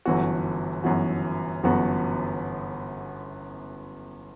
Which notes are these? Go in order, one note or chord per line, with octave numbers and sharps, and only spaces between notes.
G1 F#2 E3 B3 F#4
G1 F#2 E3 B3 F#4
G1 F#2 E3 B3 F#4